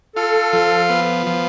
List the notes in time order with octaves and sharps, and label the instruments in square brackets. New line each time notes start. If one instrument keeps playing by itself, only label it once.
[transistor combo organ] F4 [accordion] A4
[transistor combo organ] F3
B3
F3